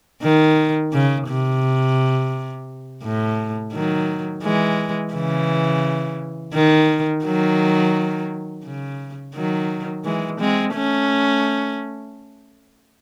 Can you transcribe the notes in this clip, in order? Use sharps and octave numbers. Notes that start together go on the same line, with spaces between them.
D#3
C#3
C3
A2
D#3 F#3
E3 G#3
C#3 E3
D#3
D#3 F#3
C#3
D#3 F#3
E3 G#3
G#3 C4
A3 C#4